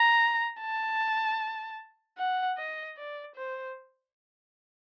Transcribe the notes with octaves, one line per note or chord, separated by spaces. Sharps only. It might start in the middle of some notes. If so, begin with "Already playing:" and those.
Already playing: A#5
A5
F#5
D#5
D5
C5